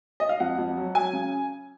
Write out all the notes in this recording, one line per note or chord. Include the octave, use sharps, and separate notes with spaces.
D#5
F5
F2 F#5
F2
F#3
F#3 G#5
C#3